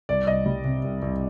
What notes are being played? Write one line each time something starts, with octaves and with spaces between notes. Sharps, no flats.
C2 D5
C2 D#5
G3
C3
C2
C2